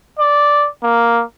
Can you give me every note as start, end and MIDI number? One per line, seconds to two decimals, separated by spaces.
0.19 0.67 74
0.83 1.22 58